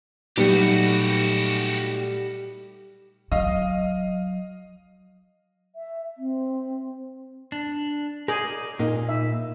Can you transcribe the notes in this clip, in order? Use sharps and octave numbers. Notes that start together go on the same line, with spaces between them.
A#2 F#3 G3 A3 D#4 F#4 G4 B4
F#3 D#5 F5
E5
C4
D4
G#4 A#4 D5
A#2 D#4 A#4
E5